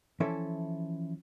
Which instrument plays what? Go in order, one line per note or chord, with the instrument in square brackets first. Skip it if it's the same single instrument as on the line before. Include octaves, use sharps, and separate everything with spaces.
[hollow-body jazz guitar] E3 F3 C#4 E4 A4 E5